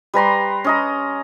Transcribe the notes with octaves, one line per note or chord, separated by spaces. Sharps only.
G3 B4 A#5 C6
C#4 D#5 A#5